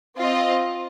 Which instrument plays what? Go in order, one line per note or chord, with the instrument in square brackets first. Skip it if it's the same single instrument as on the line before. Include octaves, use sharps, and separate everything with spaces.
[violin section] C4 F4 D#5